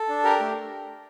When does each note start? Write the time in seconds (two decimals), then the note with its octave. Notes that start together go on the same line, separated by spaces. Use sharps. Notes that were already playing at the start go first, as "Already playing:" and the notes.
Already playing: A4
0.09 D4
0.24 G4 A#4
0.40 A3